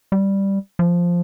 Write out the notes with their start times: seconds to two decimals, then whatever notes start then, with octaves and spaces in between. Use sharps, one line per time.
0.12 G3
0.79 F3